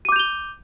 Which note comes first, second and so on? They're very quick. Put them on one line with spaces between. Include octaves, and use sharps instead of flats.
D#7 D6 G6 F7 G7